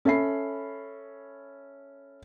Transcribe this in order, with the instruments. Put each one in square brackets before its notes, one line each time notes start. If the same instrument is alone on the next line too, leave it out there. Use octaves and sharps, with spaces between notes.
[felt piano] C#4 A4 E5 B5 C7